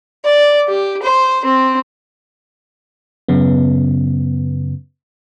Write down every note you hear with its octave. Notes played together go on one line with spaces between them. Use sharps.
D5
G4
C5
C4
F#2 C#3 B3